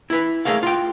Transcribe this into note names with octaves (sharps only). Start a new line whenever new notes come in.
E4 B4
A3 G#4 A#4 C#5 F5
F4 G5